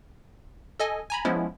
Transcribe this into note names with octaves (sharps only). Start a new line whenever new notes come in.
A4 D#5 G#5
G#5 A#5 B5
F3 G#3 B3 C#4 E4